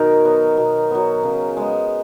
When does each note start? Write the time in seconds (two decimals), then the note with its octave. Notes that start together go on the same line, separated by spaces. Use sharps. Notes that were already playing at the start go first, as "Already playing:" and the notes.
Already playing: B2 D#3 F#3 D#4 A#4
0.25 F#3 B3
0.57 B2
0.91 F#3 B3
1.23 C#3
1.57 G#3 B3